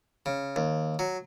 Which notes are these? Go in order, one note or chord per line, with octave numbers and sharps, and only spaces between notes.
C#3
D#2
F#3